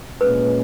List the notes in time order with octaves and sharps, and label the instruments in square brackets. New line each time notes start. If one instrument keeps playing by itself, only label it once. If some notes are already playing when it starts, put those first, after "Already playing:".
[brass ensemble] A#2 G#3 C#4 [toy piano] B4